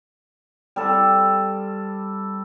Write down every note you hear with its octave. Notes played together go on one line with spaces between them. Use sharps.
G3 C4 A4